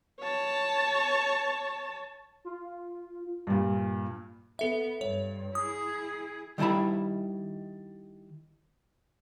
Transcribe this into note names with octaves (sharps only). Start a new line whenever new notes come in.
C#5 A5
F4
G2 A#2
B3 A4 E5
G2 C#5
E4 G#4 D#6
D#3 G3 E4 A5 B5